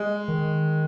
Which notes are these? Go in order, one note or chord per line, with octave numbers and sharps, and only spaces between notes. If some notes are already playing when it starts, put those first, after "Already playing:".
Already playing: G#3
D#3